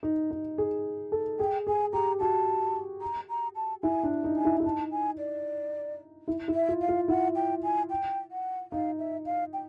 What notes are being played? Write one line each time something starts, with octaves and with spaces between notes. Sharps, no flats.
D#4
D#4
G#4
A4
G#4 G5
G#4 G#5
G4 A#5
F#4 A5
A#5
A#5
A5
E4 G#5
D4
D#4
G#5
E4
E4
D#4 A5
G#5
D5
E4
E4
E5
F4
F5
F4
E4 F#5
G5
G#5
G5
F#5
D#4 F5
E5
F5
G5